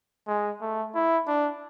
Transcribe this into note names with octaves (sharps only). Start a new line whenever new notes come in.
G#3
A3
E4
D4